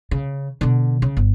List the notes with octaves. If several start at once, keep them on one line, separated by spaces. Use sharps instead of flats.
C#3
B2 D3
C#3
G1